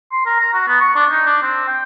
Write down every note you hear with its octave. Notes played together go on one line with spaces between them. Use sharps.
C6
A#4
A#5
F#4
B3
C#6
D4
D#4
D4
C4
G5